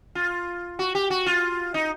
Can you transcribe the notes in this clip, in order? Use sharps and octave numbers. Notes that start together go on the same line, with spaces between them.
F4
F#4
G4
F#4
F4
D#4